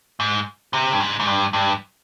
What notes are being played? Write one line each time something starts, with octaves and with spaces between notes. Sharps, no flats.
G#2
C3
G2
G#2
G#2
G2
G2